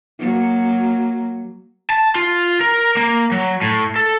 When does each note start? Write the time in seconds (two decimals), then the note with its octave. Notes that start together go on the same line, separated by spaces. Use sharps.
0.19 F#3 A#3
1.90 A5
2.15 F4
2.61 A#4
2.97 A#3
3.32 F#3
3.62 A2
3.96 A4